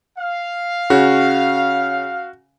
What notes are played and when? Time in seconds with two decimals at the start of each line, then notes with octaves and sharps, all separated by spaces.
0.18 F5
0.90 C#3 F#4